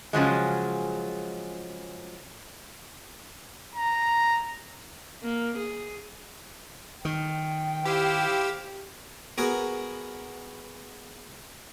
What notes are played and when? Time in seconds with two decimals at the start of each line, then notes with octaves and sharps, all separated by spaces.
0.13 C#3 F3 F#3 G#3
3.76 A#5
5.23 A#3
5.58 G#4
7.05 D#3 G5
7.86 E4 G4 C5 F5
9.38 B3 F#4 G#4 A#4